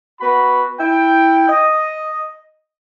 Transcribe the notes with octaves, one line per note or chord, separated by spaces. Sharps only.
B3 F#4 B5
E4 G5
D#5